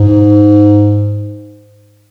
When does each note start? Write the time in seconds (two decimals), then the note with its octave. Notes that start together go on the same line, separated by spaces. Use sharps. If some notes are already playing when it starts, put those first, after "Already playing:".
Already playing: G#2